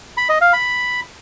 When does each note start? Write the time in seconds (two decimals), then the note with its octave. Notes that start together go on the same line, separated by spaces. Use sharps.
0.17 B5
0.29 D#5
0.41 F5
0.53 B5